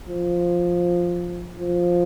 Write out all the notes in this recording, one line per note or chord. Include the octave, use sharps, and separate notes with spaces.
F3
F3